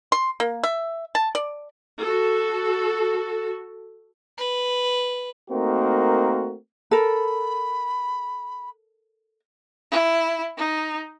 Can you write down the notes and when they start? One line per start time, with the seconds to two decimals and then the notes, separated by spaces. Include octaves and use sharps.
0.12 C6
0.40 A#3
0.64 E5
1.15 A5
1.35 D5
2.00 F#4 A4
4.38 B4
5.50 A3 A#3 C4 D#4 F#4 A#4
6.91 A4 A#4 B5
9.91 E4
10.57 D#4